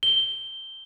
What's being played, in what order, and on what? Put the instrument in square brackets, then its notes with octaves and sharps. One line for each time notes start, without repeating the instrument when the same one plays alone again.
[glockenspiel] G7